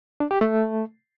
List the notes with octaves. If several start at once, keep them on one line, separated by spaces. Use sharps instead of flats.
D4
G4
A3